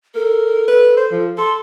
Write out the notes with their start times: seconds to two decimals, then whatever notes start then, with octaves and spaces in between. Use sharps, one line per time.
0.15 A4 A#4
0.68 B4
0.97 C5
1.11 F3
1.38 A4 C6